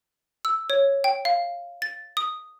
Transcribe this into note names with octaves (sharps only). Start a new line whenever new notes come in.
E6
C#5
G5
F5
A6
D#6